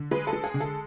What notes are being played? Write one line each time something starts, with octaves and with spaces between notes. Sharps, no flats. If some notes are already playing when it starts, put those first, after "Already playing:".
Already playing: D3
G#3 B4
A4
G#3
G#4
D3
A4